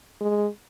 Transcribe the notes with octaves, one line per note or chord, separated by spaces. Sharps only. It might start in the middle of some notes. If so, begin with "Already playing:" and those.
G#3